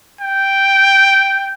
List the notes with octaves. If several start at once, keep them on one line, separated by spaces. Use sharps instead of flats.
G5